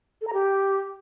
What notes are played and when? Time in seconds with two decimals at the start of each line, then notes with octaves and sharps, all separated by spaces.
0.21 A4
0.27 A#5
0.33 G4